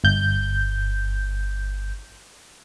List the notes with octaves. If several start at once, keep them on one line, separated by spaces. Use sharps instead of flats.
G1 G6